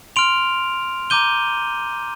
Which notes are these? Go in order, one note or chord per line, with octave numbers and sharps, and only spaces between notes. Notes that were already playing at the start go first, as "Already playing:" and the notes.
C6 F6 D7 F7
A#5 D6 G6 D#7 G7